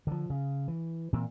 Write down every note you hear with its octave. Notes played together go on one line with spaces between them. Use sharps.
D3 F3
C#3
E3
A#2 E3 C4